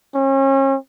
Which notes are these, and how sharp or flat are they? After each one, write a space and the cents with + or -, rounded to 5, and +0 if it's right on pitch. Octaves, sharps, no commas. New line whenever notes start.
C#4 -35